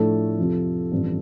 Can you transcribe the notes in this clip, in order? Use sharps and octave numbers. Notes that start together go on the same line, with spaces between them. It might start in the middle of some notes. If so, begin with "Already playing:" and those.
Already playing: A2 F3 A3 D4 A4
F2 C3 F3
A1 G2 F3 C4